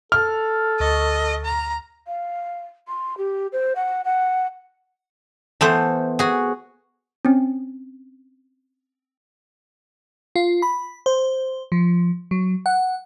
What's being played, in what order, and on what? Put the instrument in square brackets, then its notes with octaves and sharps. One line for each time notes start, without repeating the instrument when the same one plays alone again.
[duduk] A4 [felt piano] F6
[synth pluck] D2 C#6 A6 [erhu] D#5
[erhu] A#5
[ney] F5
C6
G4
C5
F#5
F#5
[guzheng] E3 A3 B3 A4 C5
F#4 G#4
[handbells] C4 C#4
[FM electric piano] F4
B5
C5
F3
F#3
F#5